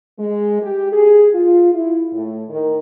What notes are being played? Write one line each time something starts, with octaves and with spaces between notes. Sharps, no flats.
G#3
G4
G#4
F4
E4
A2
D#3